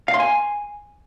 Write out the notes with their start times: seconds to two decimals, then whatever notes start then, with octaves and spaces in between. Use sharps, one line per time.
0.08 F5
0.14 C6
0.20 G#5